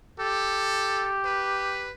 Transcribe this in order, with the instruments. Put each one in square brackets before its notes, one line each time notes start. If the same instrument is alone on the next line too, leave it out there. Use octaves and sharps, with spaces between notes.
[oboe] G4 [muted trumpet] A4
[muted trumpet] B4